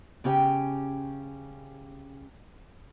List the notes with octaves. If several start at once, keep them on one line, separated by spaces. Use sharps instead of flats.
C#3 C#4 G4 G5